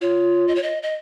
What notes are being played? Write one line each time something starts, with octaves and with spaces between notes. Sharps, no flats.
F4 C#5
D#5
C#5
D#5
D#5